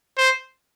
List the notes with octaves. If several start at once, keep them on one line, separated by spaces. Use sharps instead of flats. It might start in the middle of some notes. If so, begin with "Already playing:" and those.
C5